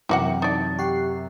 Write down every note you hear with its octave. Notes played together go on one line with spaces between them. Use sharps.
F#2 C3 E3 A#3 F#4 F#5 G5 D6
D#4 D5 A5 A6
G4 F#5 C#6 C7